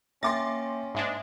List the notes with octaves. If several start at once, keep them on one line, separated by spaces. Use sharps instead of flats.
A#3 C#4 E5 G5 C6 D6 A6 A#6
G#2 G#3 D4 E5